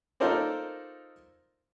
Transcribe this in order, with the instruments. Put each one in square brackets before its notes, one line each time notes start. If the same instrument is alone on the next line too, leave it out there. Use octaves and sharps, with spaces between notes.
[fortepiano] D#4 F4 A4 A#4 C5 D5